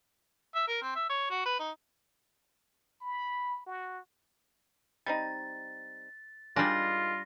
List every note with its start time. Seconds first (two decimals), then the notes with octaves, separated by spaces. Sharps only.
0.55 E5
0.68 A#4
0.82 C4
0.95 E5
1.09 C#5
1.30 F#4
1.46 B4
1.59 D#4
3.01 B5
3.66 F#4
5.06 G3 C4 D#4 A6
6.56 D#3 G3 G#3 D4 F4 G#4 A#6